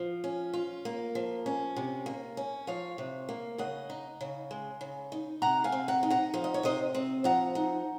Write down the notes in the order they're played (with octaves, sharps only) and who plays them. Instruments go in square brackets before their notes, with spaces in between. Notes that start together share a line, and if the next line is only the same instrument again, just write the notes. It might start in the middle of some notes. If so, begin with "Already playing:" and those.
Already playing: [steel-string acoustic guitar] F3
C#4
F4
A#3
F3
C#4
C3
A#3
C#4
F3 C#5 F5
C3
A#3
C#3 D#5 F#5
D#4
C#3
G#3
C#3
D#4
C3 F#5 A#5
F5 G#5
C4
F#5 A#5
D#4
F#5 A#5
F3 F5
D#5
C#5
C3 C5 D#5
C4
F3 F#5 A#5
D#4